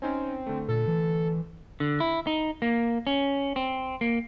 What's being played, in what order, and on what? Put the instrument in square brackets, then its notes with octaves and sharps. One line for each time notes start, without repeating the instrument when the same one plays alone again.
[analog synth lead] C4 [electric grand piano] C#4 D#4 G#5
[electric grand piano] D3 A3
[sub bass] A#2 [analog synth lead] A4
[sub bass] E3
[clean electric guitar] D3
E4
D#4
A#3
C#4
C4
A#3